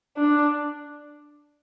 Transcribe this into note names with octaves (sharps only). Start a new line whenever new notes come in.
D4